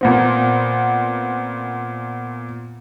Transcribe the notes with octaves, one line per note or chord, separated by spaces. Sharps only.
A#2 B3 C4